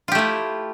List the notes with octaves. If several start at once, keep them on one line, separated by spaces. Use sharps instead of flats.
A3 E4 F4 G4